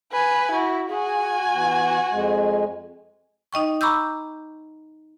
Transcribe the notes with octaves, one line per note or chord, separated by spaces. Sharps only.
B4 G#5
E4 F#4
F#4 G#4 G#5
E3 B3
F2 G#3
D#4 D#5 G5 C#6
A#5 B5 C#6 D6 E6 G6